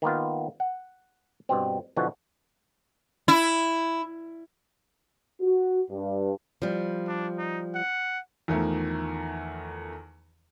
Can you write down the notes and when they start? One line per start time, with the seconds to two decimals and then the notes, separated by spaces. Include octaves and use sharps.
0.02 D#3 A#3 B3 F4
0.60 F#5
1.49 G2 B2 C4
1.97 B2 D3 E3 F3 F#4
3.28 E4
5.42 F#4
5.91 G2
6.62 F3 G3
7.08 D4
7.38 D#4
7.75 F#5
8.48 E2 D#3 F3 A3 A#5